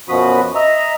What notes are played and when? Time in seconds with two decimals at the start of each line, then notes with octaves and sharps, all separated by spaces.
0.09 F#2 B2 F3 F#4 B5 D#6
0.55 D#5 E5 A#5